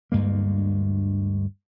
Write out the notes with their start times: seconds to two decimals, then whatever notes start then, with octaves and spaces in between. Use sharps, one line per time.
0.12 D2 G2 G#3 A#3